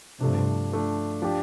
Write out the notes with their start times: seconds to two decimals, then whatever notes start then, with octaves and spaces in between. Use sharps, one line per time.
0.20 G2 C3 F3 A3 D4
0.71 F3 A3 D4
1.22 F3 D4 G4